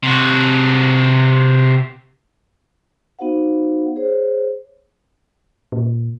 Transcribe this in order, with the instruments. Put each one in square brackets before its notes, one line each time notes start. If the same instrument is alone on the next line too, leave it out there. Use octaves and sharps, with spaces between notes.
[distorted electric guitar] C3 F#4
[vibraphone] B3 D#4 F#4 C5 F5 F#5
G#4 C5 C#5
[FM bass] A#2